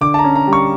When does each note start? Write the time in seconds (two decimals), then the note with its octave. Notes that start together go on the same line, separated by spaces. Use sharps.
0.01 D3 D6
0.14 A5
0.19 A#5
0.24 C#4
0.36 A#5
0.47 G3
0.53 C#6